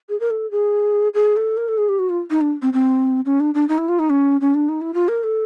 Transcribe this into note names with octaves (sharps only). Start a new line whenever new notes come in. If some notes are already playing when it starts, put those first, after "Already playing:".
G#4
A#4
A4
G#4
G#4
A4
A#4
A4
G#4
G4
F#4
F4
D#4
D4
C4
C4
C#4
D4
D4
D#4
E4
F4
D#4
C#4
C#4
D4
D#4
E4
F4
A#4
A4